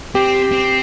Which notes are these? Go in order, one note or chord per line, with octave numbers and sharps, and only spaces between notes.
C4 G4
C4